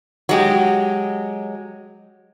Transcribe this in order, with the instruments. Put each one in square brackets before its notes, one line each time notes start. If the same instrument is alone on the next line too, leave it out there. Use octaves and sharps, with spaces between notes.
[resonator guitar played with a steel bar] F#3 G#3 G4